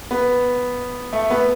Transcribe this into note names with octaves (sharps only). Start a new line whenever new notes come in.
B3
A3
B3